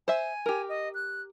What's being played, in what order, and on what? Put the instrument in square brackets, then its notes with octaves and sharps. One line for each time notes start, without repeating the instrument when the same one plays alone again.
[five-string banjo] C5 E5 [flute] G#5
[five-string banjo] G4 A#4
[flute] D#5
F#6